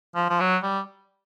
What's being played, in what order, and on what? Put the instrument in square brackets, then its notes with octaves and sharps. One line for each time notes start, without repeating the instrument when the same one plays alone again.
[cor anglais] F3
F3
F#3
G3